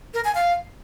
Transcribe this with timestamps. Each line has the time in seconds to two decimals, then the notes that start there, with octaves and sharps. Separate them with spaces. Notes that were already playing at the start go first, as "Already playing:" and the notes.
0.14 A#4
0.24 G#5
0.35 F5